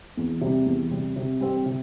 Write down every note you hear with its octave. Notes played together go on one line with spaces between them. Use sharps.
E2
C3 G3
E2
C3 G3
C3
G3 C4 G4
C3